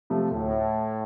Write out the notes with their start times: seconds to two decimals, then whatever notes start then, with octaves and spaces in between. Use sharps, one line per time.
0.10 C3 F3 A3
0.31 D2 A2